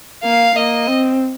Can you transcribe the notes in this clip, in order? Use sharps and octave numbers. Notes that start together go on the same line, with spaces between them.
A#3 F5
A#3 D#5
C4